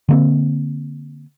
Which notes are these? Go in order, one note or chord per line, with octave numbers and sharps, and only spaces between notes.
D3 A#3 C4